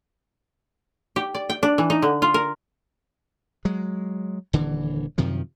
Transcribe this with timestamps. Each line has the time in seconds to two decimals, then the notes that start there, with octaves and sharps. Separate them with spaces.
1.16 G4
1.35 D5
1.50 G5
1.63 D4
1.78 E3
1.90 D#4
2.02 D3
2.22 F4
2.34 A#4
3.65 F#3 G#3
4.53 D#1 D3 E3
5.18 F#2 C3 D#3 F3